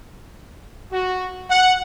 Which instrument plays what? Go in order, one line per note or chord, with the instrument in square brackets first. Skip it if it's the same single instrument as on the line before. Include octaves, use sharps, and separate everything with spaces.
[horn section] F#4
F#5